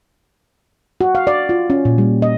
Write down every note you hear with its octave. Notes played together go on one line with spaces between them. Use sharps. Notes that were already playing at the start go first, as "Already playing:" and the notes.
F#4
F5
D5
F4
C#4
A#2
G3
D#5